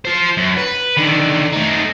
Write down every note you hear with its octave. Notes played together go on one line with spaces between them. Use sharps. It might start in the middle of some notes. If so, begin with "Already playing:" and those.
F4 C5
F#2
B4
D3 D#3
A3 D#4